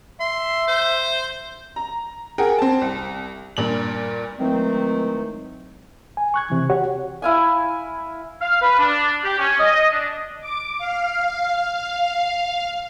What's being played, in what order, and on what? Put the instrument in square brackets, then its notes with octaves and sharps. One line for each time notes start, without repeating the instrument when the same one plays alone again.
[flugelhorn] E5 [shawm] C6
[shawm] C5
[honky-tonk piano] A#5
G#4 A#4 F#5 G5
C4 A5
C2
G2 A#2 F#7
[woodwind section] D#3 E3 F#3 G#3 A3 C4
[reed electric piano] G#5
C#6 F#6 G#6
C3 E3
F#4 G4 C#5 F#5
[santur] E4 F5 G#5
[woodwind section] F5
B4
D4
G4
C#4
D#5
D4
[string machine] D6
F5